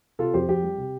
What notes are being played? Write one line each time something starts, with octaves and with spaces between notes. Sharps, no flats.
C3 F4 A4
F2 G4 C5
F2 G4
G3
C3